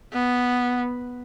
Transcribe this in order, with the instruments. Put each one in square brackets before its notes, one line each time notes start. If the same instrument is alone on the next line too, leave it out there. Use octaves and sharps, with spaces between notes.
[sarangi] B3